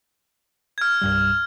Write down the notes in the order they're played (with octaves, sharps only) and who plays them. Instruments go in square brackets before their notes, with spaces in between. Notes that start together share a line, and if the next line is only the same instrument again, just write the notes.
[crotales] F6 G#6
[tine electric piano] C2 G2 G3